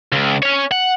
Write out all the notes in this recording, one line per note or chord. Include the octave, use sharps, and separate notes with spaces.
C#2
C#4 C#5
F#5